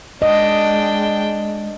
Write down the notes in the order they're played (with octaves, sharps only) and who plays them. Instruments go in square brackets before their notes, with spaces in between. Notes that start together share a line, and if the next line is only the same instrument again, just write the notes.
[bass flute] G#3 [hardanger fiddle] D4 G5 [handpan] D#5